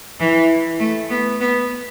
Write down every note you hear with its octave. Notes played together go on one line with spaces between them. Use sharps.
E3
A3
B3
B3